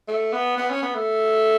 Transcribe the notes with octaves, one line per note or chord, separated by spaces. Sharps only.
A3
B3
B3
C#4
B3
A3